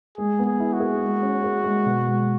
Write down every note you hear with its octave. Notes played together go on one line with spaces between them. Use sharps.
G#3 G#4
B3
G#4
E4
F#4
G#4
G#3
C#4
G#4
G#3
B2
G#3